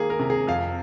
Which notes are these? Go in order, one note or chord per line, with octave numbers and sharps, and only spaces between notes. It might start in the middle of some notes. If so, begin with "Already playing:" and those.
Already playing: D#3 A#3 G#4
A#4
C3
G#4
F2 F5